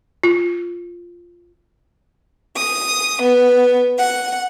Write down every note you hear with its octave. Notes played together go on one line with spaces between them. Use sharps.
F4
D#6
B3
F#5